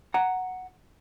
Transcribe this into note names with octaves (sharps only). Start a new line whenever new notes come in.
F#5 A#5